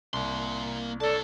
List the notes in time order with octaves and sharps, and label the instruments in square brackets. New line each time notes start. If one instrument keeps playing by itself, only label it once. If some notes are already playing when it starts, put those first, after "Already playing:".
[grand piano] C2 [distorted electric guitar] A#3 C6
[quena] A4 [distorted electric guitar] C#5 A5 [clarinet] D5